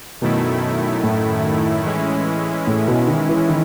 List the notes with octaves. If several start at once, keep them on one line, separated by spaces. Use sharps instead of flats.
F#2 B2 D#3 A3 E4
A2
E3 G#3 C#4 E4
A2
B2
D#3
E3
D#3